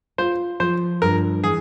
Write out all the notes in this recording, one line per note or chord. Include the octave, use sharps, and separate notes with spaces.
F4 C5
F3 C5
G2 A#4
E3 G#4